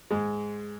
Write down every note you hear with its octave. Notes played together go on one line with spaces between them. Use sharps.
G#2 G#3